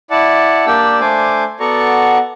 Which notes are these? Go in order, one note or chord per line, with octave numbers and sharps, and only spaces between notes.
E4 D5 F#5 A5
A#3 D4 G4 D5 E6
A3 D4 C5 G#5 D6
B3 F#4 A4 D5 A#5 C#6